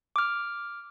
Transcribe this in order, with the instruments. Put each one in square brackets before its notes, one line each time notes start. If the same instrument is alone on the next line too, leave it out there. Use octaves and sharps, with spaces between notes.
[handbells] D6 F6